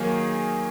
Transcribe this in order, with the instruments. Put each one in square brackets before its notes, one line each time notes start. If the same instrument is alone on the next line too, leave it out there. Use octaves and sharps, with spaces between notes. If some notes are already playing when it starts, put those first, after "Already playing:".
Already playing: [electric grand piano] D#3 F#3 A#3 D#4 [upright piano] G#4